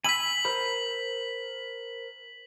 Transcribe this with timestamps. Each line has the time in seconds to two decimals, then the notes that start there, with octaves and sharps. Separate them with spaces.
0.04 G#5 B5 E6 B6 F#7
0.45 A#4 C5 B5